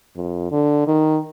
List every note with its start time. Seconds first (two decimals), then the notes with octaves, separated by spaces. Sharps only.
0.16 F2
0.52 D3
0.87 D#3